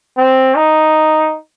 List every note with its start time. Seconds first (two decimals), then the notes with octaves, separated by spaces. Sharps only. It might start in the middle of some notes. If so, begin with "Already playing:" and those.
0.18 C4
0.56 D#4